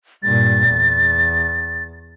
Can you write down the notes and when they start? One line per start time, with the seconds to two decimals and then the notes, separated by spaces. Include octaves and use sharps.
0.23 G2 A#2 A6
0.69 E2